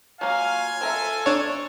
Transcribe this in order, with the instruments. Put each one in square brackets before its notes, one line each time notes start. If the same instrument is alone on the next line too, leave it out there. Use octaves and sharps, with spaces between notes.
[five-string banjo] F#3 A#3 [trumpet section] F4 G#5 [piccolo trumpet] F5
[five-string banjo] C4 A#4 E5 [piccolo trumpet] A4
[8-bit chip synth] D4 C#5